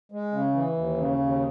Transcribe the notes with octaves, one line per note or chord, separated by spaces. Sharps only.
G#3
C#3
E3
D#2
C#3
D#2